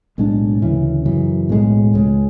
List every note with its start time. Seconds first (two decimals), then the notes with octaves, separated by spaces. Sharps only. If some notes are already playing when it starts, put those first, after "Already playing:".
0.18 B1 A2 G#3 D4
0.62 D2 C#3 E3
1.05 F#2 C#3 E3
1.49 B1 A2 G#3
1.93 C#2 C#3 G#3